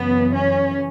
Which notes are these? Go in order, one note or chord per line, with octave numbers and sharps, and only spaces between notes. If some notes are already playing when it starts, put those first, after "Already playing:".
Already playing: F#2 C#3 E3 B3
C#4